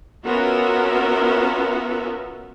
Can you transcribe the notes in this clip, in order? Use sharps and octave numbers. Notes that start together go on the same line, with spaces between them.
B3 C#4 F4 F#4 A#4 E5